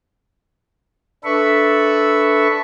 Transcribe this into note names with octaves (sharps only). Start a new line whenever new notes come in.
D4 A4 B4 E5 B5 C#6